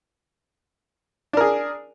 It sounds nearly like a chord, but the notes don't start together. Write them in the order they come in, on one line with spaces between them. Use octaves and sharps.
D4 A#4 G#4